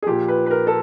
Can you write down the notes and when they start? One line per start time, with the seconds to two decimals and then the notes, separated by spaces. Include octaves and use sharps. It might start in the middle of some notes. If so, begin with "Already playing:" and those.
0.03 G#4
0.06 A#2 F3 G4
0.28 B4
0.46 B4
0.51 A#4
0.67 A4